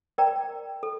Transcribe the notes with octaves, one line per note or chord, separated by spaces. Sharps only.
A#4 D5 G5 A#5
A4